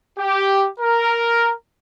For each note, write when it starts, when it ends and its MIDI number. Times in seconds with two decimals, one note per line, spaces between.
0.19 0.68 67
0.80 1.52 70